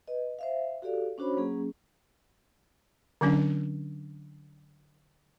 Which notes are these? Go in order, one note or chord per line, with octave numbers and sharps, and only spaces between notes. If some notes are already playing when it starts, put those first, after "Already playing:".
B4 D#5
C5 E5 F5
F#4 G4 A4 D5 F5
C#4 D4 F#4 C5 C#5 B5
F#3 A#3 C#4 G#4
D3 F#3 C#4 D4